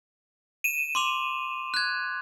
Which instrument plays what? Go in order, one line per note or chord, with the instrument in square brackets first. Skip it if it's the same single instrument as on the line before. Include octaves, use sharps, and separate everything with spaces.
[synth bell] D#7 E7
[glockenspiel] C6 D6 F7
F#6 G#6